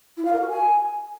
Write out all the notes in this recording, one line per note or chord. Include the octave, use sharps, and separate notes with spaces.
E4
F5
A#4
F#4
G#5